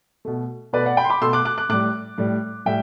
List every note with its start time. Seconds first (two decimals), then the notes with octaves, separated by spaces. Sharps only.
0.25 B2 A3
0.73 B2 A3 B4 D5
0.86 D5 F#5
0.97 G5 B5
1.04 C6
1.10 B5 D6
1.21 B2 A3 C6 E6
1.33 D6 F#6
1.45 D6 F#6
1.58 D6 F#6
1.69 A2 G3 D6 F#6
2.18 A2 G3
2.66 A2 G3 E5 G5